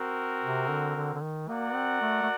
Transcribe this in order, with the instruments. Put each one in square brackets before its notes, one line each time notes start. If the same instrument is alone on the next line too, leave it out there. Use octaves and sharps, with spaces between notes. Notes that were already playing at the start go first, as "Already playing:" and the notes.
Already playing: [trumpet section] C4 F#4 A#4
[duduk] C3
D3
D3
D3
D#3
[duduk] A#3 [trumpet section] F#4 A#4 D5 F#5
[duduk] C4
A3
A3